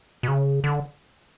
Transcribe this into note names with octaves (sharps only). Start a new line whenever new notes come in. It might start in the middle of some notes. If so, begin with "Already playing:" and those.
B2
C#3
D3